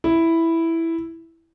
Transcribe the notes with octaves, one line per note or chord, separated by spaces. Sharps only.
E4